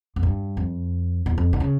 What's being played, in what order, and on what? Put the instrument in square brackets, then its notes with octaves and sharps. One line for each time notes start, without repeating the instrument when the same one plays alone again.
[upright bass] F2
G2
F2
E2
F2
D3
C#3